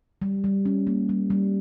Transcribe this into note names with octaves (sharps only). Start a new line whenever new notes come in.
G3
G3
C#4
A#3
G3
G3